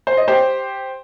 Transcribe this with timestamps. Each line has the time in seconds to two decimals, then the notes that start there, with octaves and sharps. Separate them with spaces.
0.07 C5
0.17 D#5
0.28 G4 C5